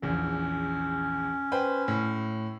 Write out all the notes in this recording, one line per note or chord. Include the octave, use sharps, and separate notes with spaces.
A#1 E2 C#4
B4 C5 G5
A2